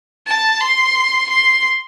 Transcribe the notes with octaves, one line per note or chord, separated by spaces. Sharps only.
A5
C6
C6